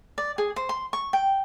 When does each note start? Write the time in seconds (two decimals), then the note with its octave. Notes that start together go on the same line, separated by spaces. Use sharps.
0.18 D5
0.38 G#4
0.56 C5
0.69 C6
0.93 C#6
1.13 G5